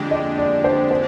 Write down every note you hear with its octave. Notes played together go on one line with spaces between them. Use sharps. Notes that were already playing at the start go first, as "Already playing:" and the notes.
Already playing: F2 D3 G#3 D4 G4 G5
D#5
D5
C5
C5